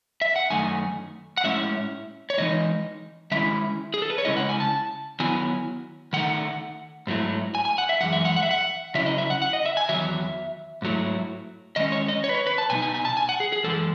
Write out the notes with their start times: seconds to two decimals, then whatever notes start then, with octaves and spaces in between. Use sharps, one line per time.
0.22 E5
0.36 F#5
0.50 F#2 D#3 A3 G#5
1.37 F#5
1.44 A2 G#3 C#4 E4 E5
2.30 C#5
2.38 A2 E3 G#3 D#4 D#5
3.31 D#3 G#3 C#4 E4 E5
3.94 G#4
4.02 A4
4.10 B4
4.18 C#5
4.25 C#3 G#3 C#4 E4 D#5
4.37 F#5
4.49 G#5
4.60 A5
5.20 D#3 F#3 B3 E4 G#5
6.13 D#3 A3 D#4 F#5
7.07 G#2 F#3 A3 E4
7.55 G#5
7.65 G#5
7.78 F#5
7.89 E5
8.01 F#2 E3 G#3 F#5
8.13 E5
8.25 F#5
8.36 F#5
8.43 E5
8.51 F#5
8.95 C#3 F#3 C#4 E4 E5
9.06 D#5
9.18 E5
9.30 F#5
9.42 F#5
9.53 D#5
9.66 E5
9.77 G#5
9.89 E2 D#3 F#3 E5
10.82 G#2 F#3 A3 E4
11.76 D#3 G#3 C#4 D#5
11.92 C#5
12.08 D#5
12.24 C#5
12.29 B4
12.35 C#5
12.47 B4
12.58 A5
12.70 B2 G#3 D#4 G#5
12.82 G#5
12.94 G#5
13.05 A5
13.17 G#5
13.29 F#5
13.40 G#4
13.52 G#4
13.64 F#2 E3 G#3 A4